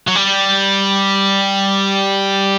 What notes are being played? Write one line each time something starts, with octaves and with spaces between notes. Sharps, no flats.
F#3
G3